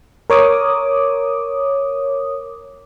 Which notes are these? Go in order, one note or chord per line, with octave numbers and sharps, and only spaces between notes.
A#4 C#5 D6 D#6